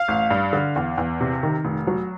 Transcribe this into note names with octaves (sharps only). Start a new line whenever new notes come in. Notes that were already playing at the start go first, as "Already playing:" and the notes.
Already playing: F5
A1
G2
D3
E2
E2
C3
D#3
F1
F#3